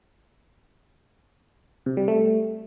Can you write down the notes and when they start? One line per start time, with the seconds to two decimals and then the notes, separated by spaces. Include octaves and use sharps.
1.86 C3
1.97 G3
2.08 A3